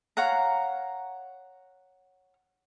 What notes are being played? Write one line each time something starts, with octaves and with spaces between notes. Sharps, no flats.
C#5 F5 F#5 A#5